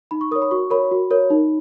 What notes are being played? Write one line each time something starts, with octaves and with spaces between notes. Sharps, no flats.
D#4 B5
C#6
A#4 C#5 D#6
B5
F#4 C#6
A#4 C#5 B5
F#4
A#4 C#5
D#4